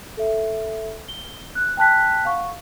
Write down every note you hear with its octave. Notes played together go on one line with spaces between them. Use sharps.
A4 E5
G7
F#6
G5 A5 F#6 B6
F5 F#5 C#6